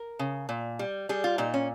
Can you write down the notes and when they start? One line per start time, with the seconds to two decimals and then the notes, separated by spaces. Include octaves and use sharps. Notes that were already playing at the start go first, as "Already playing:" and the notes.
Already playing: A#4
0.19 C#3
0.49 A#2
0.79 G3
1.09 G3 G#4
1.24 F4
1.38 A#2 D#4
1.54 C#4